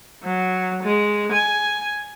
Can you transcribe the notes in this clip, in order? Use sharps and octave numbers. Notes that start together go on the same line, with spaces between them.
F#3
G#3
G#5